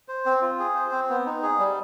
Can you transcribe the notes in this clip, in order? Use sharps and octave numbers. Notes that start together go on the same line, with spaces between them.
C5
C4
F4
G#4
C5
C4
B3
D#4
G#4
G3